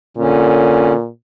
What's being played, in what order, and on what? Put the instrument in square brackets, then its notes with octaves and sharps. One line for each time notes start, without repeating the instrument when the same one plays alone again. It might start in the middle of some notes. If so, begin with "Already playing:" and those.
[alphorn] A#2 [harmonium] D3 C#4